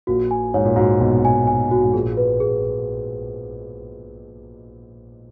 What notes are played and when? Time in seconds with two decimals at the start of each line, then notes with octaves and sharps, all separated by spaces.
0.07 A#1 A#2 F#4
0.31 G#5
0.54 G#2 C#5
0.65 A#2
0.76 G#2 F#4
1.00 B1 B2 F#4
1.25 G#5
1.47 G#5
1.71 F#4
1.83 G#2
1.94 A#1 A#2 G#4
2.17 B4
2.40 G#4